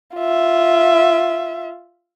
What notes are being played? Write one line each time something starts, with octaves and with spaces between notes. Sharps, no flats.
F4 E5